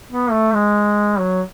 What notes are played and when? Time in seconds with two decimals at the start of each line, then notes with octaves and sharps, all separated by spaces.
0.11 B3
0.32 A3
0.54 G#3
1.19 F#3